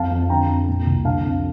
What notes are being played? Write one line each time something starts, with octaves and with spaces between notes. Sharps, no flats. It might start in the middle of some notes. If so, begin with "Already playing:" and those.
Already playing: F2 F5 A5
F2
D3 G5 A#5
F2
A#2
C2
D3 F5 A5
F2